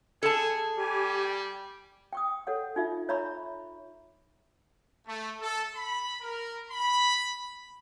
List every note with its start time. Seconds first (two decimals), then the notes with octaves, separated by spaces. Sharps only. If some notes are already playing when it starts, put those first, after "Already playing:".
0.23 G#4 A4 A5
0.78 G3 G4 G#5
2.13 G5 C#6 D#6
2.47 A4 C#5 F#5
2.76 D#4 F4 E5
3.09 C#5 E5 A#5 B5 C#6
5.07 A3
5.40 A4
5.75 B5
6.21 A#4
6.71 B5